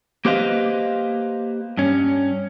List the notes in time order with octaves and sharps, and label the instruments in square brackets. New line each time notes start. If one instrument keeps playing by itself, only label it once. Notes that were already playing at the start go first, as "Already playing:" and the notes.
[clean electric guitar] A#3 G4 B4 C5 D#5 F5
G2 C#4